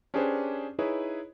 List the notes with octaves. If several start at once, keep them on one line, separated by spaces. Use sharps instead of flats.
C#4 D4 G4 G#4 B4 C5
D#4 E4 G#4 B4 C#5